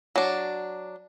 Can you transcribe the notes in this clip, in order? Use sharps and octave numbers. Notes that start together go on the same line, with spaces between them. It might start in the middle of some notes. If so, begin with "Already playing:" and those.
F#3 D4